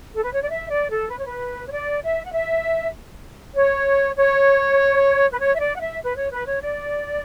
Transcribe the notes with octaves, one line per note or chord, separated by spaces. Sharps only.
A4
B4
C#5
D5
E5
D5
A4
B4
C#5
B4
C#5
D5
E5
F#5
E5
C#5
C#5
B4
C#5
E5
D5
F#5
E5
B4
C#5
B4
C#5
D5